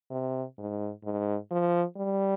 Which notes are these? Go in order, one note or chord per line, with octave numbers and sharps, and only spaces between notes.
C3
G#2
G#2
F3
G3